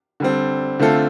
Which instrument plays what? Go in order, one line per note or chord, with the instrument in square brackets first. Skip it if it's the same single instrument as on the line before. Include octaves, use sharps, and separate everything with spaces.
[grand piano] D3 G3 C4
D3 A3 C4 F4 A4